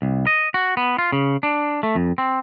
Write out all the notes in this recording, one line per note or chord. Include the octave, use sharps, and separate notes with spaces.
C2
D#5
F#4
B3
F4
C#3
D4
A3
F2
C4